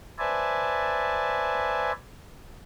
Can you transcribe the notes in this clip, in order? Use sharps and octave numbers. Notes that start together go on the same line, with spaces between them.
B4 C5 D5 E5 G#5 A5